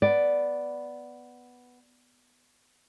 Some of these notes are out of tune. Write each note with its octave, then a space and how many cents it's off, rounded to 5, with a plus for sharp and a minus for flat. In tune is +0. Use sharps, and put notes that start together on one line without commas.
B3 +0 D5 +0